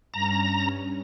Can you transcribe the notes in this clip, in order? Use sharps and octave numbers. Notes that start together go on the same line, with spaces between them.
G2 C#4 A#5